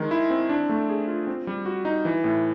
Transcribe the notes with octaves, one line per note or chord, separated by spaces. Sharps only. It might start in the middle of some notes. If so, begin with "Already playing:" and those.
Already playing: D#3 G#3
E4
C4
D4
A3
G#4
F4
C4
G3
F#4
D#4
E3
A2